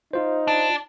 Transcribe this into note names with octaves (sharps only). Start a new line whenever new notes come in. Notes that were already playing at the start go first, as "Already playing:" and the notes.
D#4 F4 C5
D4